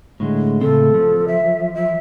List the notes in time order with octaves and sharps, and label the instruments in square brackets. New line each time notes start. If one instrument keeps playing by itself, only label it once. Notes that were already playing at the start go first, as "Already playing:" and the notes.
[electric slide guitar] A2 D3 G#3
[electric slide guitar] A2 C#3 C4 [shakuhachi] A4
[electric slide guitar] F3
[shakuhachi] E5
E5